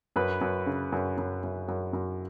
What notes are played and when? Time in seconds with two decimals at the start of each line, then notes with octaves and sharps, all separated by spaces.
0.16 F#2 B4
0.41 F#2
0.66 C#3
0.92 F#2
1.17 F#2
1.43 F#2
1.68 F#2
1.93 F#2